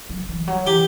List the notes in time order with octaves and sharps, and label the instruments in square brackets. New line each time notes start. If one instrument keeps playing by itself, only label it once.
[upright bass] F#3
E3
F#3
[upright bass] E3 [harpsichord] G4